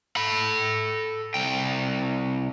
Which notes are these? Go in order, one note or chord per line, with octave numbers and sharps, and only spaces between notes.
A4 B5
C2 G5